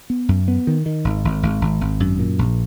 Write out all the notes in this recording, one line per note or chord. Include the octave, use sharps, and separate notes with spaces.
B3
F#2
B3
D#3
D#3
G#1
G#1
G#1
G#1
G#1
F#2
A#2
A#1